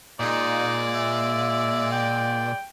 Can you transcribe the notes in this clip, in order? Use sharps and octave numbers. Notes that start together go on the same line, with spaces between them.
A#2 G#3 D#4 D5
E5
G5